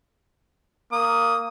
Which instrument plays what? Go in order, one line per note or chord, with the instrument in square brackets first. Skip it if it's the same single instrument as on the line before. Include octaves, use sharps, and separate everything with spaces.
[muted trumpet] A#3 [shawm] D#6